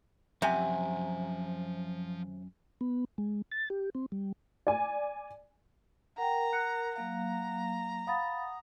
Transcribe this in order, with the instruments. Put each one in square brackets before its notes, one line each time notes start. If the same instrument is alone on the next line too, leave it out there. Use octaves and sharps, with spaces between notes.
[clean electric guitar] F#2 G#5 [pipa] C3 [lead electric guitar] F3 F#5
[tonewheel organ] B3
G#3
A6
G4
C4
G3
[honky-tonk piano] D5 G#5
[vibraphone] A#4 [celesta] F#5 G5 [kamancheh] A#5
[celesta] F#5 F#6 C#7
[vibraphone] F#3 A#3 F5 [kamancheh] A#5
[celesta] F5 B5 A6 [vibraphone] F#5 D#6